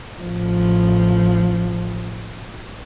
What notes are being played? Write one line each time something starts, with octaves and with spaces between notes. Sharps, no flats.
A1 F3